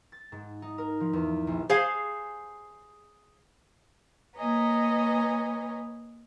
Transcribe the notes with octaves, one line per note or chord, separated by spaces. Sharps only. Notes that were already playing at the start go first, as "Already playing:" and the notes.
A6
G#2
D#4
A#4
F3
E2
A#1
G#4 C5 F5 G#5
A#3 B4 C#5 D#5 G#5 A#5